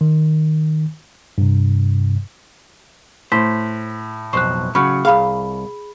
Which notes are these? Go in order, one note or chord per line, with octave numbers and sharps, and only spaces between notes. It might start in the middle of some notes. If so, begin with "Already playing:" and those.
D#3
G2 C3
A2 C5 B6
B1 F2 C5 C#6 F#6
C#3 F#3 B5 C#6 F6
C2 G#4 F5 B5